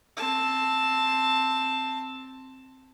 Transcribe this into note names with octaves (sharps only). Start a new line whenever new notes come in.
C4 A5